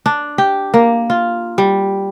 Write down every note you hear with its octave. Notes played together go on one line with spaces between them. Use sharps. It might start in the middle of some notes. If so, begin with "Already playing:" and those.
D4
G4
A#3
F4
G3